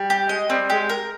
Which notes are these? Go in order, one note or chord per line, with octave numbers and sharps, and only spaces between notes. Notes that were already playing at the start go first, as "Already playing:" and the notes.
Already playing: G3
G4
G#3 D#5
G3 C4
G#3 G4
A#4